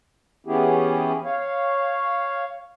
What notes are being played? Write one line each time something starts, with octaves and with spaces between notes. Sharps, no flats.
E3 B3 C#4 E4 G4 G#4
C#5 F5